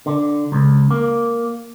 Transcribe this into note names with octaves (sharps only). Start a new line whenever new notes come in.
D3
C#2
A#3